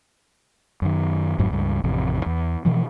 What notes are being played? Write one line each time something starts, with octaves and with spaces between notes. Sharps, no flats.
F#2 D#3
G#1 F2 G#2 F#3
C#2 G2
A1 F2 C3
E2
B2 E3 F3